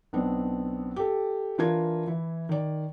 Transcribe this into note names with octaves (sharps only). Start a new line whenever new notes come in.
B1 B3 C4 D4
G4 A4
E3 D4 F4 A#4 G#6
E3 E4
D#3 D5